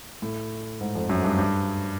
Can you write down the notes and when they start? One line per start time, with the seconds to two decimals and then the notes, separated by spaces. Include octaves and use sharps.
0.22 A2
0.81 G#2
0.95 F2
1.09 F#2
1.24 G2
1.39 G2